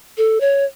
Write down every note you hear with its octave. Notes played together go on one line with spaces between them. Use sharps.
A4
C#5